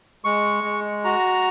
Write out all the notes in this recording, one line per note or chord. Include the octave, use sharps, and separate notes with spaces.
G#3 C#6
G#3
F#4 A#5